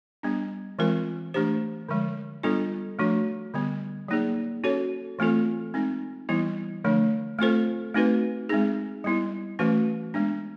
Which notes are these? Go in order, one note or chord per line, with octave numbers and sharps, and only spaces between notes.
G3 B3 D4
E3 G#3 C4 F4 A#4
E3 A3 D4 G4 C5
D3 F3 G#3
G3 B3 D4 F4 A4
F3 A3 D4 F#4
D3 G3 B3
F#3 A#3 D#4 G#4
C#4 F#4 A4 C#5
E3 A3 C4 F4 A4
G#3 C4 D#4
E3 G3 B3 E4
D3 F3 A3 D4
A3 C4 F4 A4 C5
A3 C4 D#4 F#4 B4
G#3 C4 D#4 G#4
G3 B3 E4
E3 A3 C#4 F#4 B4
G#3 B3 D4